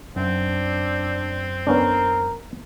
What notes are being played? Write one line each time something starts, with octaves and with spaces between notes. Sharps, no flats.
F#2 C4 D4
B3 C#4 D4 A#4